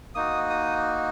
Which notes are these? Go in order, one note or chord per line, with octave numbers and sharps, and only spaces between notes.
A#3 D#4 F#4 D#6
D#6